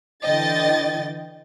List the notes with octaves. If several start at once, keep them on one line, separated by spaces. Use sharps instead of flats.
D3 E3 D#5 G5 A6